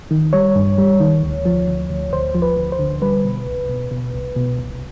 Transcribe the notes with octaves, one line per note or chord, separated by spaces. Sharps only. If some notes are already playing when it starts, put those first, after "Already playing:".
D#3
G3 C#5
G2
G3
D#3
D2
F3
D2
D2
D2 C5
F3
B4
D2
C5
D3
G3 B4
B2
C2
B2
B2
C2
B2
C2